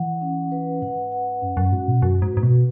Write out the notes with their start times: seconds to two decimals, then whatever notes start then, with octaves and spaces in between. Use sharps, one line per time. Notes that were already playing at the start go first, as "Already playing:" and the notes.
Already playing: E3 F#5
0.21 C#4
0.52 B4
0.82 G#2 F#5
1.12 F#5
1.42 F#2 C#4
1.57 F#2
1.72 G#2 F#4
1.87 B2
2.02 F#2 F#4
2.22 G#2
2.32 G#2 B4
2.43 B2